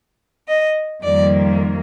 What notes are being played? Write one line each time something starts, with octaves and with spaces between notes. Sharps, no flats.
D#5
F2 D#3 G3 A#3 D5